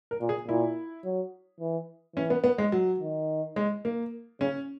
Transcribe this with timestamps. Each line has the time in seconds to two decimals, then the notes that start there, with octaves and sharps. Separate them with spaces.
0.11 A#4
0.21 A#2
0.29 G#4
0.47 A#2 E4
1.04 F#3
1.60 E3
2.16 E3 C#4
2.30 B3
2.44 B3
2.58 G#3
2.72 F#3
3.00 D#3
3.56 G#3
3.85 A#3
4.40 C#3 C#4